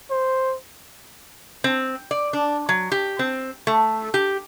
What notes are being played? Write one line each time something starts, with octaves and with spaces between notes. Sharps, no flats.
C5
C4
D5
D4
F#3
G4
C4
A3
G4